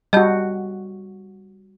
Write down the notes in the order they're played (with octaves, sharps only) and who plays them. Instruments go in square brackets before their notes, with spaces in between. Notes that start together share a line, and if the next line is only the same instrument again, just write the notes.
[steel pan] G3 F#4 [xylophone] D#5 A5 G6